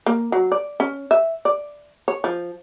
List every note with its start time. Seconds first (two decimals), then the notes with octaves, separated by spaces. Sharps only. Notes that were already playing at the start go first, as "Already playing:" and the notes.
0.06 A#3
0.32 F#3
0.52 D5
0.80 C#4
1.11 E5
1.45 D5
2.08 C#5
2.24 F3